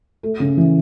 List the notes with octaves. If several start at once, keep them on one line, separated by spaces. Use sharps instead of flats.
A3
C#3
E3